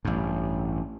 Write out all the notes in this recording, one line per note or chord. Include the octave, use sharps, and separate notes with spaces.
A1 G2